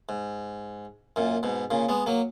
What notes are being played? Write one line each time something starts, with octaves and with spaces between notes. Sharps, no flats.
G#2
F#2 A#2
G#2 B2
A#2 C#3
G#3 B3
F#3 A#3